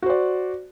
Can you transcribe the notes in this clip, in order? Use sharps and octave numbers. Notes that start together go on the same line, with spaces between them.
F#4 C5 D5